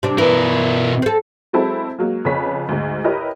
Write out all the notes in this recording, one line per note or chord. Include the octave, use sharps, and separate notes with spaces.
C3 D4
B2 E3 A#4
C4 A4
F#3 G#3 C4 E4 A4
F#3 G#3 A#3
F2 C#3 B4 C#5 B6
D2 G#2
E4 G4 A#4 B4 C#5 D#5